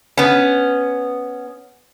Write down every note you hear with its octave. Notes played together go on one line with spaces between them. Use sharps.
B3 C#4